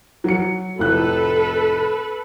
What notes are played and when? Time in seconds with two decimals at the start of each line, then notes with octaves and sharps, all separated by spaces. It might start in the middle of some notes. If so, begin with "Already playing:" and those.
0.24 F#3 C#7
0.79 F1 A2 A4 B4 F#6